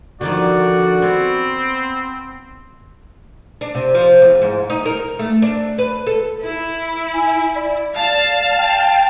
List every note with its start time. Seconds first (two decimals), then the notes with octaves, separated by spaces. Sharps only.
0.21 D3 D#3 F3 F#4 D5
1.02 B3 C4
3.61 D4
3.75 C3
3.94 F3
4.22 E2
4.42 G#2
4.70 D#4
4.86 A#4
5.19 A3
5.42 D4
5.78 B4
6.07 A4
6.43 E4
7.14 G#5
7.55 D5
7.95 F5 A5
8.57 G5